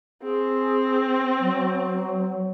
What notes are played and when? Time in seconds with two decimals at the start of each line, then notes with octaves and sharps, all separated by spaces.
0.23 C4 G#4
1.41 F#3